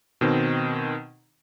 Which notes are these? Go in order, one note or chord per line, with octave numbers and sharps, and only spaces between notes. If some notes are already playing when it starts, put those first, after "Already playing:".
B2 D#3 C4